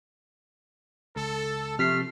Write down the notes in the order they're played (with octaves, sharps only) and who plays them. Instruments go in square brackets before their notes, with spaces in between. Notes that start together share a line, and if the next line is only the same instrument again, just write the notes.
[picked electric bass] C#2 [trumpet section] A4
[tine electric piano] C3 B6 C7 [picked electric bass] F3 [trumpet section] A3 [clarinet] F6